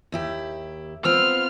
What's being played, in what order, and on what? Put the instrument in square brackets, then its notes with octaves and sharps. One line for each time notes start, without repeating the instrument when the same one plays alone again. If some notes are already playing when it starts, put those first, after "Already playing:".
[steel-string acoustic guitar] D#2 E4 G4
[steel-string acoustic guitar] B3 C4 F4 [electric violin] F6